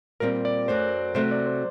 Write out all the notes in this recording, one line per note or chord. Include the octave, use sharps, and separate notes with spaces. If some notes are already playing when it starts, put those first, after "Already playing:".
A#2 G3 C4 G4 A#4
D5
F#2 F#3 A3 C5
C3 F#3 A3 C5
D5
C5